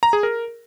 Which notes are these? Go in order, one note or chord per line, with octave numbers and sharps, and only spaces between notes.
A#5
G#4
A#4